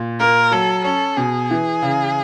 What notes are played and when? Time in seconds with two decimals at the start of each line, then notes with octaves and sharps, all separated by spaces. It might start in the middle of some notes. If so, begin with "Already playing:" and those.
Already playing: A#2
0.20 A#3 A#4
0.52 F#3 A4
0.84 C#4 A4
1.17 B2 G#4
1.51 E3
1.82 C#3